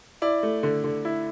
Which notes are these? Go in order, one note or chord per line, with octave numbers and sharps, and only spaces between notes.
E4 D5
A3
D3
D3
E4